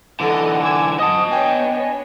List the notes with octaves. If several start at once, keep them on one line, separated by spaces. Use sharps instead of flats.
D3 E3 A4 D#5 F#5
G#5 D6 E6 G#6
F#2 F3 D#5 F#5 A5 D#6
B3 D4 C#5 G5 G#5